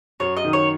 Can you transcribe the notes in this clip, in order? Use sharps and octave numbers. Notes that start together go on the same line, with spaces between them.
F#2 C#5
D#5
D#3
C#5